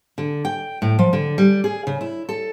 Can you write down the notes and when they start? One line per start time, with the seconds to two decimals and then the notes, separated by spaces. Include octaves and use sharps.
0.18 D3
0.45 G5
0.82 A2
0.99 F3
1.13 D3
1.38 G3
1.64 G#4
1.87 C#3
2.01 E4
2.29 A4